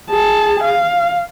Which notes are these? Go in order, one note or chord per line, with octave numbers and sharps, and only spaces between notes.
G#4 A5
F5